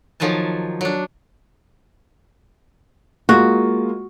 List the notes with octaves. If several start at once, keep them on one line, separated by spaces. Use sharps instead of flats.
D#3 F3 F#3 G#5 A5
F#3 D4
G#3 A#3 F4 F#4